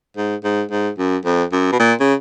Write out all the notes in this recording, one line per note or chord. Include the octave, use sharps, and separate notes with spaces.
G#2
G#2
G#2
F#2
F2
F#2
B2
A#2
C#3